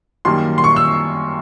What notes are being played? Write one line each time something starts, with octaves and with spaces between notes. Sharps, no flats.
F#2 D#3 G3 A#3 C6
C6
C#6
E6